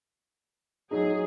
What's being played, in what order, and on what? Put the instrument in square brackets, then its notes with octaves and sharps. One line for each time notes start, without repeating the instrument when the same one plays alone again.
[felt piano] F#3 D#4 [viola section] G#4